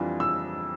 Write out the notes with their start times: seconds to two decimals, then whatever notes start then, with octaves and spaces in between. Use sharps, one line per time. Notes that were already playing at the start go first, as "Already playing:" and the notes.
Already playing: F2 E3 G3 D4 F4
0.20 E6